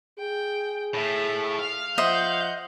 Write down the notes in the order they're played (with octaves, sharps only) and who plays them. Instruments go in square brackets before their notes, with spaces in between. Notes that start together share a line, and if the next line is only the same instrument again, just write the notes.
[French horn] G#4 [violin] G5
[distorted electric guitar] A2 [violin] E5 A5
[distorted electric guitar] F5 [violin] F6
[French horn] F3 [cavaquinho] C5 D#5 E5 [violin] F#5 G6